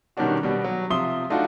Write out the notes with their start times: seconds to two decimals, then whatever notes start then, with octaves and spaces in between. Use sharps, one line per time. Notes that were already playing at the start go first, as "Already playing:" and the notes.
0.17 B2 D#3 G3 C#4 D4 F#4
0.43 B2 G3
0.64 F#3
0.90 C3 F3 E5 C6 D#6 G7
1.30 A3 D4 D#4 F4 F#4